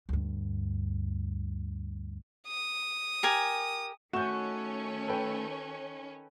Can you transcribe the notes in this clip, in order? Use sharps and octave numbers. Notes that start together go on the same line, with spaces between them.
D2 G2
D#6
G4 A#4 G#5
D#3 A3 C#4 F#4 G6 E7
A4 B4 G5